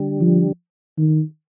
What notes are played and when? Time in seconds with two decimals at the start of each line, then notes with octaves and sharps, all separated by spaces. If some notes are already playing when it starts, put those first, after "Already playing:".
Already playing: D3 G3 D4 G4
0.21 F3
0.98 D#3